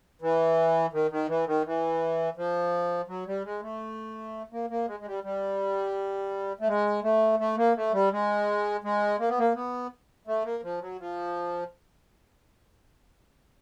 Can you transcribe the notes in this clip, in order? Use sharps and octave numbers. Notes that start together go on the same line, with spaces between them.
E3
D#3
D#3
E3
D#3
E3
F3
F#3
G3
G#3
A3
A#3
A#3
G#3
G#3
G3
G3
A3
G#3
A3
A3
A#3
A3
G3
G#3
G#3
A#3
B3
A#3
B3
A3
A#3
F3
F#3
F3